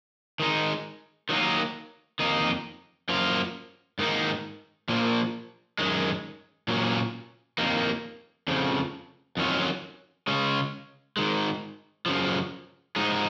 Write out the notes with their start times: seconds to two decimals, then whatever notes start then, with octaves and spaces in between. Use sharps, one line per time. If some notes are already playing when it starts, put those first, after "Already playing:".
0.40 D#3 G#3 D#4
1.29 D#3 F#3 A#3 D#4
2.19 F2 D#3 A#3 D#4
3.09 F#2 F3 A#3 F4
3.99 G#2 D#3 A#3 D#4
4.89 A#2 F3 A#3
5.78 F#2 D#3 G#3
6.68 A#2 F#3 A#3 C#4
7.58 F2 D#3 A#3
8.48 F2 C#3 F3
9.37 F2 D#3 F#3 C#4 F4
10.27 C#3 G#3 C#4
11.17 G#2 D#3 G#3
12.06 F#2 C#3 F3
12.96 G#2 F3 G#3 D#4